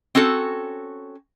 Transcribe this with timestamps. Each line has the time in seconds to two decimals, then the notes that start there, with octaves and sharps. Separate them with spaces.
0.15 C4 C#4 F#4 A4